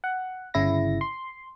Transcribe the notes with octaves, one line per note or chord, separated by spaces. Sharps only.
F#5
G1 C#3 E4 A#6
C6